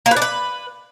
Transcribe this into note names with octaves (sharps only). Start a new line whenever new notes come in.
A#3
B4
D4
B4